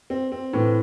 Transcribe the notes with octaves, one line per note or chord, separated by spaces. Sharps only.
C4
C4
A2 E3